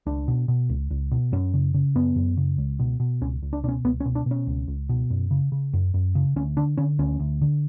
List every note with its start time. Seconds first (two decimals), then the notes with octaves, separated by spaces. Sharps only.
0.06 C#2 D4
0.28 B2
0.48 B2
0.70 C#2
0.91 C#2
1.11 B2
1.32 F#2 C#4
1.54 C#3
1.74 C#3
1.95 F#2 B3
2.16 F#2
2.37 C#3
2.58 C#2
2.79 B2
3.00 B2
3.21 C#2 C#4
3.42 C#2
3.53 D4
3.63 B2 D4
3.69 C#4
3.84 C#2 B3
4.00 C#4
4.05 B2
4.15 D4
4.26 B2
4.31 C#4
4.47 C#2
4.68 C#2
4.89 B2
5.10 F#2
5.31 C#3
5.52 C#3
5.73 F#2
5.94 F#2
6.15 C#3
6.36 D2 C#4
6.57 D3 D4
6.77 D3 C#4
6.99 D2 C#4
7.20 D2
7.41 D3